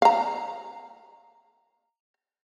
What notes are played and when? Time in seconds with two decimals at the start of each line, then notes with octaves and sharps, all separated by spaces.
0.02 F5 A#5